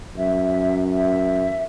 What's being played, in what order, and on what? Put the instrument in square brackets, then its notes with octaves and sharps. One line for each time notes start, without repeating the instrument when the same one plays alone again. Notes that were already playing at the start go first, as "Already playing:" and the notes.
[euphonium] F#2 [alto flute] E5
[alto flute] E5